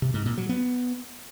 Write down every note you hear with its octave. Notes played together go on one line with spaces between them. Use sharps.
C3
G#2
A#2
F#3
B3